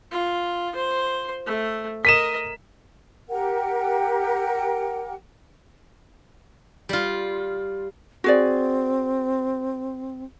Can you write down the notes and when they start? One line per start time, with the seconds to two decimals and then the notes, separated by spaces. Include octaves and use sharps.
0.12 F4
0.76 C5 C6
1.46 A3
2.05 A#4 D#5 B6 D#7 E7
3.29 G4 A#4 F#5 G5
6.89 G3 F4
8.24 C4 F#4 G#4 D5